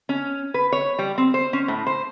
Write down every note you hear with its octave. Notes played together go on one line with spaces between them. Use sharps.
C#4
B4
C#5
G3
C4
C5
C#4
A2
C5